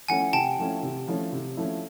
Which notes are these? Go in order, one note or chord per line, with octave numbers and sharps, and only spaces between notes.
F3 A3 C#4 E4 F#5 G#5
C3 G5 A5
F3 A3 C#4 E4
C3
F3 A3 C#4 E4
C3
F3 A3 C#4 E4